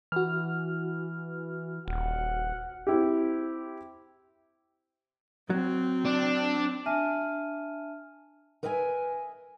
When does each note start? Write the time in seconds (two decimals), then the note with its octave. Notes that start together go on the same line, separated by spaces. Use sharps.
0.12 E3 F#4 F6
1.88 D#1 F#5
2.87 C4 E4 G4
5.50 F#3 C4
6.05 D4
6.86 D4 E5 G#5 A5 F6 D#7
8.63 A#4 B4 D#5 E5 F#5 G#5